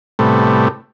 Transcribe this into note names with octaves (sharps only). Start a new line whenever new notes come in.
A2 C3 G3 A3 B3